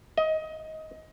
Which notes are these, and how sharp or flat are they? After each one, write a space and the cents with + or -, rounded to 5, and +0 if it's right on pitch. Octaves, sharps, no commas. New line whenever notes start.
D#5 +20